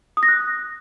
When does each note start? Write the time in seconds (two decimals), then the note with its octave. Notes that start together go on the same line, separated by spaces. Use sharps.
0.17 D#6
0.23 A#6
0.28 F#6